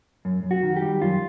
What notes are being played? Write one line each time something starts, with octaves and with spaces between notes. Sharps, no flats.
F#2
F#2
F#4
D#3
G4
G3
F#2 F4